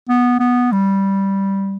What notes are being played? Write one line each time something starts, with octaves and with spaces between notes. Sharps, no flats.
B3
B3
G3